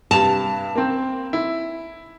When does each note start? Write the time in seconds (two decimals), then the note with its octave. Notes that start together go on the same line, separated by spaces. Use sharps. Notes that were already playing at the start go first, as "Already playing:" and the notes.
0.11 G2 C3 A5 F7
0.75 A#3 C4
1.33 E4